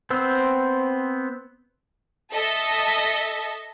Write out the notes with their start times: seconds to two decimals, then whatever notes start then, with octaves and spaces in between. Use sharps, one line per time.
0.10 B3 C4 C5 E6
2.33 A4 D#5 E5 A5